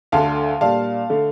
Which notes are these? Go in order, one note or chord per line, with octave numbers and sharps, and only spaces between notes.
D2 D3 A3 F5 A5
A#2 G3 D4 F5 A5
D3 A3